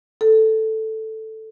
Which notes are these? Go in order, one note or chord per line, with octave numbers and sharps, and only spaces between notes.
A4